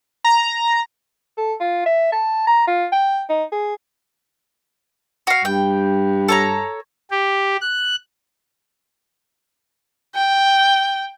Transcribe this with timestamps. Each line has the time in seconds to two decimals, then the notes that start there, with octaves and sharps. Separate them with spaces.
0.24 A#5
1.38 A4
1.60 F4
1.86 E5
2.12 A5
2.47 A#5
2.67 F4
2.92 G5
3.30 D#4
3.52 G#4
5.27 F#4 F5
5.45 G2 G5
6.29 A4 C#5 A#5
7.11 G4
7.61 F#6
10.15 G5